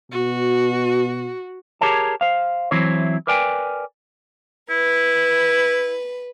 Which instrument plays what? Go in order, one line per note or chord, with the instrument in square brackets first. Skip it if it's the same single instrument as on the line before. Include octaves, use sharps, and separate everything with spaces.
[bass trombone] B2 [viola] F#4
[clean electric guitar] G4 G#4 A#4 C#5 A5
C5 F5
E3 F#3 C4 E4 C5 C#5
A#4 B4 D5 G5 G#5
[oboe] E4 [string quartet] B4